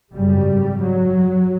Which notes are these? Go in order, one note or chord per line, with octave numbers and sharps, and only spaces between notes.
G#1 F#2 C#3 G3
F#3